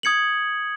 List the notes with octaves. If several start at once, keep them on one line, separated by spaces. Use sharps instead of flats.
D#6 G#6 C#7 F#7